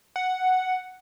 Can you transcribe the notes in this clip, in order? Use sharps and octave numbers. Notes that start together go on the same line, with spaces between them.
F#5